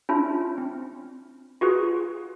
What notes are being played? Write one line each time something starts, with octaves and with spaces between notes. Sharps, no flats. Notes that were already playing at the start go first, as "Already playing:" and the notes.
C#4 D4 E4 F4
C4
F4 F#4 G#4 B4